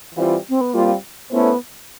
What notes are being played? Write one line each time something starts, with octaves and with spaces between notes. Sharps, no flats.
E3 G3 C4 F4
C4
B3
G3 A#3 C4 F4
A3 B3 C#4 E4 A4 C5